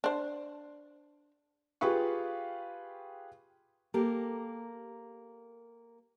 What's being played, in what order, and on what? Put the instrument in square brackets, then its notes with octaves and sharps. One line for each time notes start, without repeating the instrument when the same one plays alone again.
[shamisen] D4 C5
[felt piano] F4 G4 G#4 B4 F5 C#6
[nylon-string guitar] A#3 G4 A4 A#4